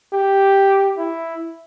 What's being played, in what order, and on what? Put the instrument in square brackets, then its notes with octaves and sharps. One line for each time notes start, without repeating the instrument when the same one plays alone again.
[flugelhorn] G4
E4